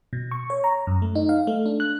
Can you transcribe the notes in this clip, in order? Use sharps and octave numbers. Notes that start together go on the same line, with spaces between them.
B2
C#6
C#5
A#5
F#2
A3
D#4
F5
A3
D4
F#6